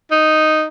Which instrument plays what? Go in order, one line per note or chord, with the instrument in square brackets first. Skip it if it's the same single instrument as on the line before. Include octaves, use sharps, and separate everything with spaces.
[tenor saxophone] D#4